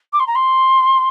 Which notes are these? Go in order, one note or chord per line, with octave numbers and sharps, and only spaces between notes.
D6
C6
A#5
C6